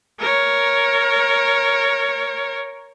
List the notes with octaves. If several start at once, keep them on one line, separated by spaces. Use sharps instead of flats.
A#4 C#5